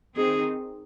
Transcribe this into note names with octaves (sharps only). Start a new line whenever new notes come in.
D#3 C4 D#4 G#4